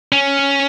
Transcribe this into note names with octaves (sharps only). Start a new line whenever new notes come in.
C#4